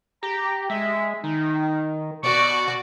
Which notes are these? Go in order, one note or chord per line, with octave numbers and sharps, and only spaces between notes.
G4 A#5
G#3 E5
D#3 D#4
B2 F#4 D5 C#6